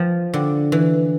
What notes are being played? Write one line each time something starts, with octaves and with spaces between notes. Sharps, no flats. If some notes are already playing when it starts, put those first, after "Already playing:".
Already playing: F3
D3
E3